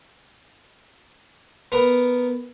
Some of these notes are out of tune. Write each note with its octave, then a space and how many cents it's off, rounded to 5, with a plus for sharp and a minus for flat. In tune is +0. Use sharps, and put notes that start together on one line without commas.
B3 +0 A#4 +0